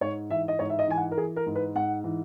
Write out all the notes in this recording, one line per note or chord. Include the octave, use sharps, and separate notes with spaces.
G#2 C#5
E3 E5
D#5
G#2 C#5
E5
D#5
E3 G#5
F#5
A#4
E3 G#4
A#4
G#2
B4
G#2 F#5
E3